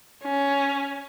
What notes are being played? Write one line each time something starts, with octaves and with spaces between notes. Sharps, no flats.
C#4